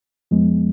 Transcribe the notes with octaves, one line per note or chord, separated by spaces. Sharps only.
F2 F3 G#3 B3